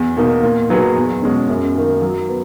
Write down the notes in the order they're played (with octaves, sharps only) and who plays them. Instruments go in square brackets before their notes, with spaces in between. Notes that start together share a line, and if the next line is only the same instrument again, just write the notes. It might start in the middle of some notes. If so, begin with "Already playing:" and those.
Already playing: [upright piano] E2
B2 A#3 D#4
A#2
F#3 B3 D#4 G#4
E2
B2 G#3 C#4
F#2
D#3 A#3 D#4
F#3
B3